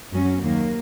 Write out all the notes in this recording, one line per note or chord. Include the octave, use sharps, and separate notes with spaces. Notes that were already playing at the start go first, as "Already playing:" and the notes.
F#2 F#3 C#4
D#2 D#3 F#3 A#3